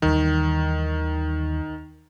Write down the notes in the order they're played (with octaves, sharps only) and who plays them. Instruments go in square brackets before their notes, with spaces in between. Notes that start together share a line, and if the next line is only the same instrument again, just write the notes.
[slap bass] D#2 E3 G3 [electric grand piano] D#3